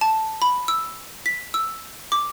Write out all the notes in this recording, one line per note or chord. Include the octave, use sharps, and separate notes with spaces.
A5
B5
E6
B6
E6
D6